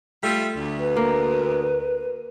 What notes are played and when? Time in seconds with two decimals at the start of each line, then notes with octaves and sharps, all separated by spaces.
0.23 G3 A3 F4 E5
0.56 D2
0.80 B4
0.96 A#3